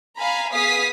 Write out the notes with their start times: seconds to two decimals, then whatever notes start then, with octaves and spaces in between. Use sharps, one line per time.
0.17 F5 G#5 A#5 B5
0.52 B3 G#4 F5 D#6 B6 C7